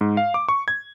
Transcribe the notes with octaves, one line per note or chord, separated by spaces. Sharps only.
G#2
F5
D6
C#6
G#6